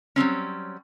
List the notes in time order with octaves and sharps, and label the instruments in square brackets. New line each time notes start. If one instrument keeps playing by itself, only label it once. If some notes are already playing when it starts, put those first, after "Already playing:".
[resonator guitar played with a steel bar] F#3 G3 C4 C#4